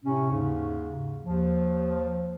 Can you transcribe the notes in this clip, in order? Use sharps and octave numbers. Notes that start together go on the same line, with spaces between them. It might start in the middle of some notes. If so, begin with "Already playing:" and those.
A2 C3 C#4
D#2 G#2 C#3
D#2 F3